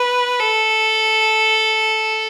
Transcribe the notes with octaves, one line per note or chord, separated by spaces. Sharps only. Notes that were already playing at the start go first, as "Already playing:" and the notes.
Already playing: B4
A4